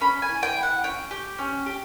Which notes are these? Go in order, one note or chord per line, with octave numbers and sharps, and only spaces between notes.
C#4 B5
G#5
E4
G5
E4
F#5
C#4 G5
G4
C#4
G4